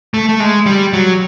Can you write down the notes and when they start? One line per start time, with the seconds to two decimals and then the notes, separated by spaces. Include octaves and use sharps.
0.14 A3
0.29 A3
0.40 G#3
0.66 G3
0.93 F#3